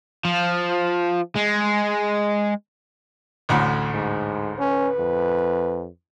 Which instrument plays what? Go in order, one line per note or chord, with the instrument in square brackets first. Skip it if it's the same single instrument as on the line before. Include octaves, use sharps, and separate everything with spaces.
[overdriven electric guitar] F3
G#3
[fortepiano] A1 D2 A2
[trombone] G#2
[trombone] C#4 [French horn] B4
[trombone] F2